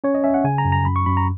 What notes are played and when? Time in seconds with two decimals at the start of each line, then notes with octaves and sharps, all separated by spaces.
0.04 C#4 C#5
0.15 D#5
0.24 C#4 E5
0.34 F#5
0.44 C#3 G#5
0.58 A#5
0.65 F#2
0.72 A#5
0.85 F#2 B5
0.96 C#6
1.06 F#2 B5
1.17 A#5